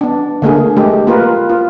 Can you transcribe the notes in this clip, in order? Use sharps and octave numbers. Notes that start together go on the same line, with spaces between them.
B3 D4
D3 A3 A#3 G#4
G#3 A3 G4
A#3 F4 A#4 B4
F4